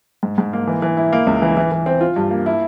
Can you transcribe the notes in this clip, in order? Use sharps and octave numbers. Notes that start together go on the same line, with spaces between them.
G#2
G#2
A#3
E3
E3
E4
A#3
C#2
E3
E3
E3
C4
F4
G2
A#3
E4